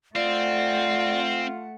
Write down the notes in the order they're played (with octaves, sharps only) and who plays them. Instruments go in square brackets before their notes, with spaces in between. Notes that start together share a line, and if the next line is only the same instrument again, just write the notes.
[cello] A3 F#5 [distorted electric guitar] C4 [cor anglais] F4 [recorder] D5